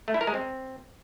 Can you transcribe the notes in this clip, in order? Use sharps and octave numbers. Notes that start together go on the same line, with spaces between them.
A3
E4
A#4
G#3
C4